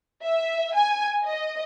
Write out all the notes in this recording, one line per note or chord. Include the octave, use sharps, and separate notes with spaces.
E5
G#5
D#5